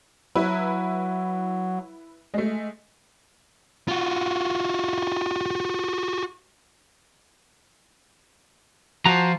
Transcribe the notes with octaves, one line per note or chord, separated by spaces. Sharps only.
F#3 E4 B4
G#3 A3
F4 F#4
F3 F#4 A#5